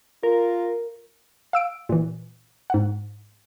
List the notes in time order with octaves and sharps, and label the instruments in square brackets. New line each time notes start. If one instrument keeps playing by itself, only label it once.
[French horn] F4 [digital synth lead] A#4
[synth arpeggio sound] F5 E6 D7
A#2 E3
G#2 F#5